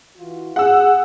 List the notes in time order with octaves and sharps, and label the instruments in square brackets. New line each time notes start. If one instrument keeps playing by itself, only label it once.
[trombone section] E3 F4 F#4
[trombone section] G#4 [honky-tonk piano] F#5 E6